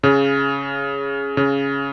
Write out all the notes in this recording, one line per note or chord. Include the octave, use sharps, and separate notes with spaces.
C#3
C#3